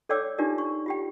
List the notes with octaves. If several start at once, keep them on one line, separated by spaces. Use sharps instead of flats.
A4 C#5 D5 G5 D6 E6
D4 D#4 F4 G4 A#4 D5
C#6
F4 G4 G5